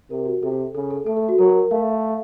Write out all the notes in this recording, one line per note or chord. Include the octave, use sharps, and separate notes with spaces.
C3 A#4
F#4
C3 A4
C#3 A4
A4
A3 A4
A4
F#4
F#3 A#4
A#4
A#4
A3 F5